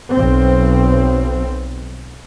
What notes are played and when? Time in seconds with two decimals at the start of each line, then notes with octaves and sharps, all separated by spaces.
0.12 B1 C4